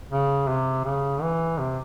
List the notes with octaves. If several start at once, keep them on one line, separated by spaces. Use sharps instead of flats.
C#3
C3
C#3
E3
C3